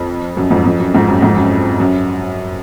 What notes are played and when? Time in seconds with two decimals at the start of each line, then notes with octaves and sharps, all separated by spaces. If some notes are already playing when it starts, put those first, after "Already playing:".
Already playing: F2
0.37 F#2
0.50 F2 G#2
0.66 F2
0.80 F#2
0.94 F2 G#2
1.08 F#2
1.22 F2 G#2
1.36 F#2
1.80 F#2